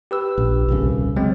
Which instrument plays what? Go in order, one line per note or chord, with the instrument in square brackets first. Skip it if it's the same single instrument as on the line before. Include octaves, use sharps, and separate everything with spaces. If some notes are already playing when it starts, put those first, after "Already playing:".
[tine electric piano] G4 B4 E6
[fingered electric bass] A#1
D#1 C2 C#3
[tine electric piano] F#3 G#3 C4